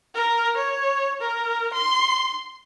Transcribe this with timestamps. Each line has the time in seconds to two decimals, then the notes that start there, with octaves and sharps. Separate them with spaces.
0.15 A#4
0.57 C#5
1.21 A#4
1.74 C6